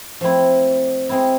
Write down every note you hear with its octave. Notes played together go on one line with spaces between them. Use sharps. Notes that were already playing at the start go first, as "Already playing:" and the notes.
F3 A3 C4 E4
G#3 C4 E4